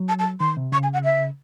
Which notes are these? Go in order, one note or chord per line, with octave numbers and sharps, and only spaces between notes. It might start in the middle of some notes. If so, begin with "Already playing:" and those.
Already playing: F#3
A5
A5
D#3 C6
C3
C#3 C#6
G#5
F#5
E5